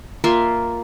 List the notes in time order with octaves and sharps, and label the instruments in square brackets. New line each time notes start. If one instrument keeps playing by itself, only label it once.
[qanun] A#3 F4 E5 C6